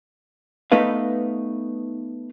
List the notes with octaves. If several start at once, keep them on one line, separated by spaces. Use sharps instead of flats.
A3 B3 D#4 B4 F5